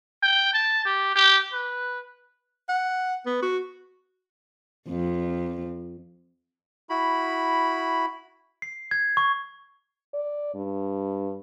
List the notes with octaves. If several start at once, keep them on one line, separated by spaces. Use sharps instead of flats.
G5
A5
G4
G4
B4
F#5
B3
F#4
F2
E4 F#4 B5
C7
G#6
C#6
D5
G2